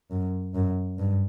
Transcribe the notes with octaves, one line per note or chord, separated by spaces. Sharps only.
F#2
F#2
G2